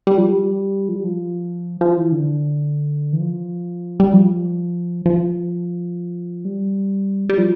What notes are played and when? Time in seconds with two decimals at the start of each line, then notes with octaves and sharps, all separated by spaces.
0.07 G3
0.18 F3
0.29 G3
0.89 F3
0.96 G3
1.04 F3
1.81 F3
1.97 E3
2.12 D3
3.13 E3
3.20 F3
4.00 G3
4.13 F3
5.06 F3
6.45 G3
7.29 G3
7.38 F3